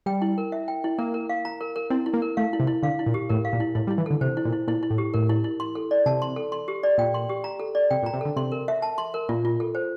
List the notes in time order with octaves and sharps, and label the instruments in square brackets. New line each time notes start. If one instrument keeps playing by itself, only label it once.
[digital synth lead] G3 [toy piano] G5
[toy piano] E4
A#4
E5
G5
E4
[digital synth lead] A#3 [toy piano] A#4
[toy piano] A#4
F5
A#5
A#4
A#4
[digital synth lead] C4 [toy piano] E4
[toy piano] E4
[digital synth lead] A#3
[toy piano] A#4
[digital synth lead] A3 [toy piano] F5
[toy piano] E4
[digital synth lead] C3
[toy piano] E4
[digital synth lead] D3 [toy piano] F5
[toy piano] E4
[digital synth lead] A#2
[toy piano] G4
[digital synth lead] A2 [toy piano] A#4
[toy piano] F5
[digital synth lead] A#2
[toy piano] E4
[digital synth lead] A2 [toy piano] E4
[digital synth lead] G3
[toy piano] E4
[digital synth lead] E3
[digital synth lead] D3 [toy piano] A4
[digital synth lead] C3 [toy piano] C5
[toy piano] E4
[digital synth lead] A#2
[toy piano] E4
[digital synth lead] A#2 [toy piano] E4
[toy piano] E4
[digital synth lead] A2
[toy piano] G4
[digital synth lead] A2 [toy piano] A#4
[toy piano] E4
E4
C6
A4
D5
[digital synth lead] C3 [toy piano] A5
[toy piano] C6
A4
C6
G4
D5
[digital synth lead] A#2 [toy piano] G5
[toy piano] C6
G4
A#5
A4
D5
[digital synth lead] C3 [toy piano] G5
[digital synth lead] A#2
[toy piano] A#5
[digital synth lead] C3
[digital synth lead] D3 [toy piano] A4
[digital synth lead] C3 [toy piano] C6
[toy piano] A#4
E5
A5
C6
A#4
[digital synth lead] A#2 [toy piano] F4
[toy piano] F4
A4
C5